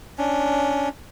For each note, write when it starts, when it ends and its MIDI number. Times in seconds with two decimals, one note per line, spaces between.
0.18 0.89 61
0.18 0.89 62